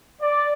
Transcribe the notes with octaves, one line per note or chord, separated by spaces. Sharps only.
D5